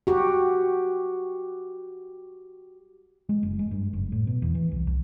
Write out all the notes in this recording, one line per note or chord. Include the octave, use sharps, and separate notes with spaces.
F#4 G4
G#3
F#1
G#3
G2
F#1
A2
B2
E2
E3
C2
C2